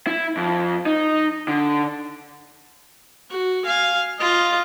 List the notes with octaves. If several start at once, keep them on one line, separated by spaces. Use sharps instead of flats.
E4
F2
D#4
D3
F#4
F5 G#5
F4 D#5